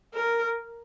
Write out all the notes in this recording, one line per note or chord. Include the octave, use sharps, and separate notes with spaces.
A#4